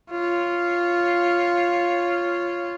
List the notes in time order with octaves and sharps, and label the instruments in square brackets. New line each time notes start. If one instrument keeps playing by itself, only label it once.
[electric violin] F4 C#5